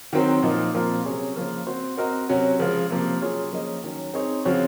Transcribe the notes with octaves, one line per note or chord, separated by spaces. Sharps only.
D#3 F#3 C4 F#4
A#2 F3 A#3 D#4
A#2 F3 C4 F4 A#4
C3 F#3 C#4 G#4 C#5
C#3 F3 A#3
C4 F#4 C5
C4 F#4 A#4 D#5
C3 F#3 C#4 F#4
C#3 F3 G#3
C3 F3 A#3
F#3 C#4 F4 G#4 C#5
F3 A#3 C#4 G#4 D#5
D#3 F#3 C#4
C4 D#4 G#4 C#5
C#3 F3 C4 F#4 C#5